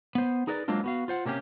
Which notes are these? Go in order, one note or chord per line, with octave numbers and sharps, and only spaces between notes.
B3 C5
D#4 G#4 A#4 B4 D5
F#3 G#3 A#3 C4 D4 F4
B3 F#4 F5
F4 C5 F#5
C3 A#3 C#4 D4 G4